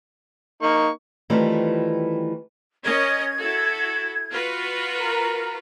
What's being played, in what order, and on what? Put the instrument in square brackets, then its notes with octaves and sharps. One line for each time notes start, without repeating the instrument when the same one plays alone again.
[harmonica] A#3 C#6 [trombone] D#4
[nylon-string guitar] D#3 E3 G3 A3 C4 F4
[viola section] C#4 A#4 D#5 [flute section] G#6
[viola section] E4 F#4 A4
F4 F#4 B4
[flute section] A#4